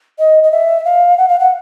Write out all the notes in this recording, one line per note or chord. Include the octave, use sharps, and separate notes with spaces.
D#5
D#5
E5
F5
F#5
F5
F#5